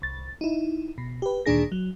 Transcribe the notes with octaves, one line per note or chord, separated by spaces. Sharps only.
C2 A6
D#4 E4
B2
G4 B4
D2 A#2 D#3 D4 G#4 A#6
F#3